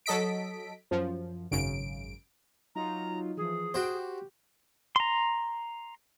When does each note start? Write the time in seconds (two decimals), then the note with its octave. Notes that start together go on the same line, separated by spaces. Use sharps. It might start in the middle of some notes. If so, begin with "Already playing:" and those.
0.06 F#3 A4 D#5 B6 D7
0.91 F#2 F3
1.51 G#1 F#2 C#3 D7
2.75 F#3 D#4 F4 A#5
3.37 E3 F3 G#4
3.74 F#4 C5 G5
3.91 G4
4.96 A#5 C6